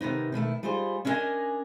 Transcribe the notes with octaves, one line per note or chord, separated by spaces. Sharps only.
C3 D#3 B3 D#4
B2 D#3 A3 E4
G3 D#4 F4 G#4 C5
C#4 D4 E4 A#4 D#5 G#5